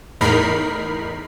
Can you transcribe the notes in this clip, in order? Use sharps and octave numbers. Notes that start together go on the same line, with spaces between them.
E2 A2 D#4 A#4 B5 C7